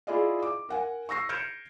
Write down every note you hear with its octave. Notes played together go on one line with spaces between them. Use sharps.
E4 F4 G#4 D5 D#5 F5
D6
A#4 F#5 G#5
C#6 E6 A#6 C7
F6 G6 G#6 C#7 D7 E7